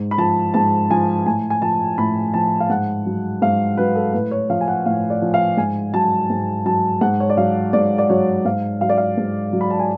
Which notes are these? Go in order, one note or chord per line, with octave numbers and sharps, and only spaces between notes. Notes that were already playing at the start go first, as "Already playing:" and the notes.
Already playing: G#2
B5
F3 A5
G#2 A5
F3 G#5
A2 G#5
G#5
F3 A5
A2 B5
F3 A5
F5
G#2 F#5
F#3
G#2 F5
F#3 B4
A4
A2 B4
C#5
F3 F5
G#5
F#5
A2 F5
D5
F3
F5
G#2 G#5
F#3 A5
G#2
F#3 A5
G#2 F#5
C#5
D5
F#3 F5
G#2 D5
D5
F#3 C#5
G#2 F5
F#3 F5
D5
F5
G#2
F#3
B5
A5
G#5